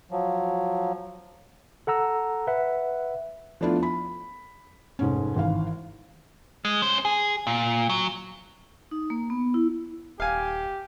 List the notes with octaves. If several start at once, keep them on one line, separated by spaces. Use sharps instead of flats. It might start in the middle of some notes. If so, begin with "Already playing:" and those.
F3 F#3
A4 F#5 A#5 E6
B4 E5 F#5
F3 A3 B3 D4 E4 F4
B5
F1 G#2 C#4
G#1 E3 F5
G#3
C#4 C5
G#4
A#2
F#3
D#4
A#3
B3
E4
D#1 G4 F5 G#5